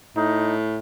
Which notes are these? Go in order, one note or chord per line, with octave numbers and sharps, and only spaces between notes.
A2 D#4